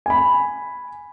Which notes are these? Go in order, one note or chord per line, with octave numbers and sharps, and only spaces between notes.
G#5 B5